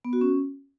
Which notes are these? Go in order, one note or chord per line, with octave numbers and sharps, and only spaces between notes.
B3
F#4
C#4